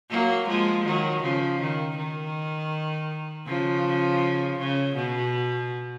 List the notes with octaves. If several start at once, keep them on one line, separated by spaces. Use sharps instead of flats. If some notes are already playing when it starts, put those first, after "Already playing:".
F#3 A#3
F3 G#3
D#3 F#3
C#3 F3
D#3
D#3
C#3 F3
C#3
B2